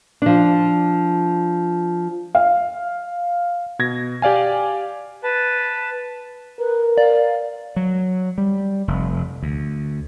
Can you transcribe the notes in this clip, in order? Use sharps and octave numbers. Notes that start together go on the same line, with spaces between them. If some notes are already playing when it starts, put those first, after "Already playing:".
F3 D4
F5
B2 G#6 A#6
G4 D5 F5 G#5
B4 A5
A#4 B4
D5 F5
F#3
G3
F1
D2